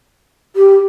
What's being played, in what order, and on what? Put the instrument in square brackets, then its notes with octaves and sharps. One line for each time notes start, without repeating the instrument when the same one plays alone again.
[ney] G4